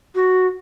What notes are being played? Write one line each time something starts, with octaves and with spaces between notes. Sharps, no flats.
F#4